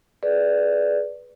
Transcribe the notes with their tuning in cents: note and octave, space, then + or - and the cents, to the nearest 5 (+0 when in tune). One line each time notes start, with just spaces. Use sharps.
G#4 +30 B4 +0 D5 +0